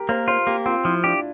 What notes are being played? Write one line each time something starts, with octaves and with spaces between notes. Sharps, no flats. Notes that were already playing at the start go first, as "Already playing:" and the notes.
Already playing: G4 A#4
A#3 C5
F4 C5
A#3 G4
C4 F4
F3 E4
D4 G4